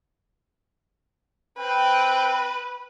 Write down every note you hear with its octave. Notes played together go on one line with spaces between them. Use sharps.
C4 B4 G5